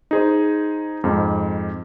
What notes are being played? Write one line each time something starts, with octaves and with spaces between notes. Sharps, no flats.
D#4 G#4 C5
F2 G#2